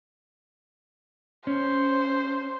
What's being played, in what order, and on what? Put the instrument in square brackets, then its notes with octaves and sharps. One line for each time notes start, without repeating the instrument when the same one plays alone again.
[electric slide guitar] C#4 [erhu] C5